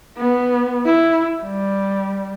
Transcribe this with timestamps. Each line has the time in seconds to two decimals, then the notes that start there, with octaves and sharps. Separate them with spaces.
0.18 B3
0.86 E4
1.43 G3